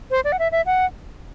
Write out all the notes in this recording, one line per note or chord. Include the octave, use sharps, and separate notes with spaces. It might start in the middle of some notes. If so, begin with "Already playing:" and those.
C5
D5
F#5
E5
E5
F#5